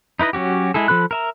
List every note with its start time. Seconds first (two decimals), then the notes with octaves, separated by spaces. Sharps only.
0.19 D#4 E4 B4 D#5
0.33 F#3 C#4 F#4 G4
0.74 G#3 E4 G#4 A4
0.88 F3 F4 A4 B5 F#6
1.11 A#4 E5 A#5